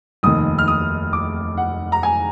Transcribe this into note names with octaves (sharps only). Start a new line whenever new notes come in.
F1 D#2 D#3 D#6
F6
D#6
D6
F#5
A#5
G#5